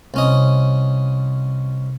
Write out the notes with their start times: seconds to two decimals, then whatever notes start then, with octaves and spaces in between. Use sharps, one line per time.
0.14 C2 C#4 D#5